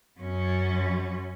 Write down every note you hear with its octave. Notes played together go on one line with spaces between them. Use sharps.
F#2 C#4